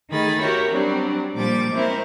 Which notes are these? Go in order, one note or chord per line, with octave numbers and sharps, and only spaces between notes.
D#3 A3 G#4 B5 A6
E4 F#4 G4 A#4 C#5
F#3 G3 C4 D4
A#2 F3 G3 D6 A6
G#3 C4 C#4 E4 A#4